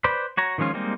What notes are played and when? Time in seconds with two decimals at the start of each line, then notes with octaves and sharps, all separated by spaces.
0.04 B4 C5 D5 B5
0.37 F#4 C#5 A#5
0.58 D#3 F3 G#3 C#4 F4
0.74 G3 G#3 A#3 C4 D#4